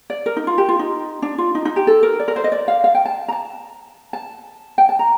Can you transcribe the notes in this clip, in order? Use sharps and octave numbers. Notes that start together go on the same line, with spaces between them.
D5
A#4
D#4
F4
G4
F4
D#4
D4
F4
D#4
D#4
G4
A4
A#4
D5
A#4
C5
D#5
D5
F5
F5
G5
A5
A#5
A5
A5
G5
A5
A#5